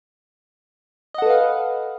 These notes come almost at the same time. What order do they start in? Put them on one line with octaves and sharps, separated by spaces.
D#5 F#5 A4 B4 F5